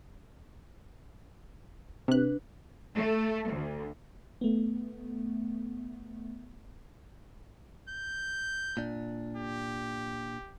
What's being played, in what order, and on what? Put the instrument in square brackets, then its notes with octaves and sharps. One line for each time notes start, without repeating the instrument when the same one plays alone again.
[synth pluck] C3 F#6 [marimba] D4 B4
[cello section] A3
D2
[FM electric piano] A3 B3
[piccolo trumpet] G6
[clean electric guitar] A#2 D4
[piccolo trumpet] G4